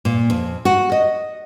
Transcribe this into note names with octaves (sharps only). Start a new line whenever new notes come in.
A#2
F2
F#4
D#5